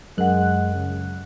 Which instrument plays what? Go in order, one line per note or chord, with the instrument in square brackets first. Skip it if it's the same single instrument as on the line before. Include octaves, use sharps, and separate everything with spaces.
[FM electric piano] F#2 F#6 [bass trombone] G#3 [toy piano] A#4 F#5
[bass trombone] C#3